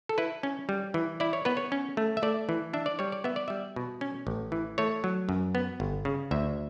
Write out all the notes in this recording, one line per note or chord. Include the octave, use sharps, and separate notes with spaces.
A4
E4 B4
C#4
G3
E3
E4 D5
C#5
B3 B4
C#5
C#4
A3
E5
A3 D5
E3
D4 E5
D5
G3 C#5
D5
B3 E5
D5
G3 E5
B2
C#4
A1
E3
A3 C#5
F#3
F#2
B3
G1
C#3
D2 E5